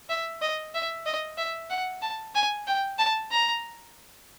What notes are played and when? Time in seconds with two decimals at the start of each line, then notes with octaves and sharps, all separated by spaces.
0.09 E5
0.42 D#5
0.74 E5
1.06 D#5
1.38 E5
1.70 F#5
2.02 A5
2.35 G#5
2.67 G5
2.99 A5
3.31 A#5